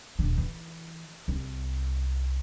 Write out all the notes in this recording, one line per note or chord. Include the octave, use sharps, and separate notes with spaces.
D#1 D3
E3
C2